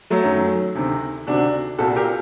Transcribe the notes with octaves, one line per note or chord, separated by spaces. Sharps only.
F#3 A3
F#2 D#3
D2 C3 D#3
D2 C3 D#3 D4 F#4
C2 A#2 F#4 A4
G4 A#4